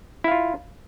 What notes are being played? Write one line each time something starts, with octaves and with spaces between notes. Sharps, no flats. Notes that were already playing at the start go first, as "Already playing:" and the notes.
E4 F4 F5